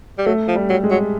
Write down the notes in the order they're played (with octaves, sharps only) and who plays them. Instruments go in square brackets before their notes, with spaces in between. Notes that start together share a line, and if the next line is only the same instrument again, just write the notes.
[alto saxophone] G3
[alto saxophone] F#3 [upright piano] A3
[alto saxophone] F3
[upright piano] G3
[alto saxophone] F#3
[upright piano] G#3
[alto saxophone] F#3